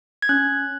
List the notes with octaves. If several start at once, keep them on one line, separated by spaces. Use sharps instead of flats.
G#6
C#4 F#6